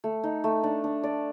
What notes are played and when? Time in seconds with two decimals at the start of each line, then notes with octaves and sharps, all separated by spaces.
0.04 A3
0.24 D#4
0.44 A3
0.64 D4
0.84 D4
1.04 D5